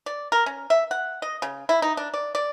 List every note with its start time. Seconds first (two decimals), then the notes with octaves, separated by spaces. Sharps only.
0.06 D5
0.32 A#4
0.46 C#4
0.70 E5
0.91 F#5
1.22 D#5
1.42 C#3
1.69 E4
1.82 D#4
1.97 D4
2.14 D5
2.35 D5